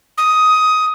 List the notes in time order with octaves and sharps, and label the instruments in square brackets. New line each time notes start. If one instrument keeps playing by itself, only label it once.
[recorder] D#6